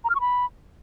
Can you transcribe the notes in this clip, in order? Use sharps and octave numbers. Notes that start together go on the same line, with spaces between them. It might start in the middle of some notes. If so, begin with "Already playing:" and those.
A#5
F6
C#6
B5